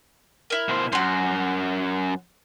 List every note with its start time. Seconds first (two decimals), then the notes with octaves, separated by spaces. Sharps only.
0.50 E4 A#4
0.69 B2 C5
0.92 F#2 F#4 C6